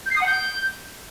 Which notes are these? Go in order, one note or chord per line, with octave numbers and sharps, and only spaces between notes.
G6
C7
D#6
F#5
G6